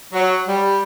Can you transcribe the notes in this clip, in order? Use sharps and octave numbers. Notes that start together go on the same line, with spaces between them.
F#3
G3